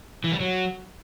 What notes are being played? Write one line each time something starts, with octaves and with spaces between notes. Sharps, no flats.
E3
G3
F#3